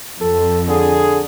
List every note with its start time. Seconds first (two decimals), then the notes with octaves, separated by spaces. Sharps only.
0.21 F2 A4
0.68 D3 G#4